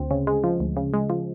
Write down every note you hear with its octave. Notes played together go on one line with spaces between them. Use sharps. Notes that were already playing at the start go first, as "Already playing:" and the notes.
Already playing: D2 C4
C#3
G#3
F3
D2
C#3
G#3
F3